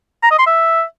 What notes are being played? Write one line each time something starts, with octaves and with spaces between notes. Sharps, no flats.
A#5
D#5
C6
E5